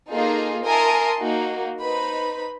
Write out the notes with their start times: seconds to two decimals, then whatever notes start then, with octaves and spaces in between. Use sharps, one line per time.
0.11 A#3 D#4 F4 G#4 A4
0.64 A#4 E5 G#5 A5 C6 D#6
1.21 A#3 D#4 F#4
1.81 D#4 B4 C5 B5